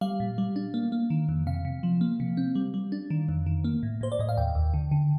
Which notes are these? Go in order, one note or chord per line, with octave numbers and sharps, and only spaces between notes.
G3 F5
A#2
G3
D4
A#3
A#3
D#3
F2
C3 F5
C3
F3
A#3
C3
C4
G3
G3
D4
D#3
F2
D#3
A#3
A2
A2 C5
D5
A2 D#5
F5
D#2 G5
D#2
D3
D3